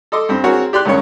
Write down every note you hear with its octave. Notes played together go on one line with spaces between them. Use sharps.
A4 D#5 C6 D6
G2 C4
C4 F#4 G#4 A#4 C#5
G4 D5 C6 F#6
C#2 G2 D#3 C#4 C#5